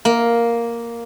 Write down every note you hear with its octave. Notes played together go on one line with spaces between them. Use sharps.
A#3